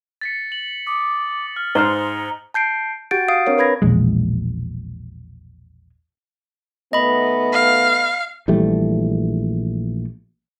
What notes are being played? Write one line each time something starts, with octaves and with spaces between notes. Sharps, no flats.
A6 B6 C#7
F#7
D6 D#6
F6
G#2 C5 A#5 F6 G7
A5 G6 C7 D7
F#4 G4 F#5 G6 A6 D7
F5 D#6 C7 D7
C4 D4 A#4 C#5
A#4 B4 B5 G#6 A#6
E1 A#1 G#3
D#3 A3 B3 D#5 B5
F5
A#1 E3 G3 A3